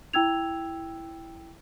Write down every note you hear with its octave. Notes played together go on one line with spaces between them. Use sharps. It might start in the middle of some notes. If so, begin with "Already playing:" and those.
E4 G5 E6 G#6 F7